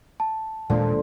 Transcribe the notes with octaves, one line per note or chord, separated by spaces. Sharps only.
A5
D#1 A#2 D3 F3 G#3 A#3